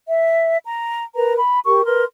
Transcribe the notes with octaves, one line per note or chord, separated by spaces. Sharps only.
E5
A#5
A#4 B4 A#5
B5
G4 A#4 C#6
A#4 B4 C6